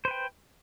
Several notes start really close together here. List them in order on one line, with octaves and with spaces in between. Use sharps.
C5 B4 G5